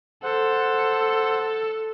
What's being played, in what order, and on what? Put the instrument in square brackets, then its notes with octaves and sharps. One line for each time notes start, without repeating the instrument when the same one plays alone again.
[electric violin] A4 [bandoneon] C5 F#5